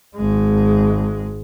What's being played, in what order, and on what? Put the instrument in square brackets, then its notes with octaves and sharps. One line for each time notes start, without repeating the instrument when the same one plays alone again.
[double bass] G#1 G#3